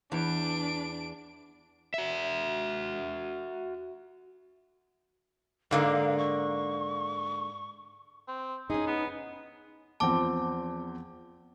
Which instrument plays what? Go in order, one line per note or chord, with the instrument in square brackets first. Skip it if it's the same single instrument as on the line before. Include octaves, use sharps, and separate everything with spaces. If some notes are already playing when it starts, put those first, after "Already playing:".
[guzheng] E2 [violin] D4 D7
[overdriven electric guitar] F#4 E5
[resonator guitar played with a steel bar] G#2 D3 A#3 [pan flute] F5
[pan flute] C#6
[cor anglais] C4
[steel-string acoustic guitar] C#4 D#4 [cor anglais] G#4
[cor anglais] B3
[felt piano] E2 F3 C4 [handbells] A5 D6